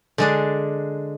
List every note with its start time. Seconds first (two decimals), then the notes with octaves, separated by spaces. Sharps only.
0.18 D3 G#3 D4